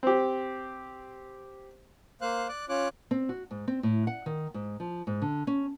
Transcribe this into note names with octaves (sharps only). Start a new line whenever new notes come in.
C4 G4
A#3 C5 F5 F#6
D5 D6 F#6
C#4 F4 C#5 D6 F#6
C4
F#4
G#2
C4
A2
F#5
D#3
G#2
F3
G#2
D3
C#4